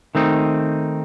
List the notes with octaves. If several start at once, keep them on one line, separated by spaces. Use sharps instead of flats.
D#3 A3 C4 D#4